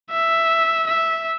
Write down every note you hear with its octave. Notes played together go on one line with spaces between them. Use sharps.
E5
E5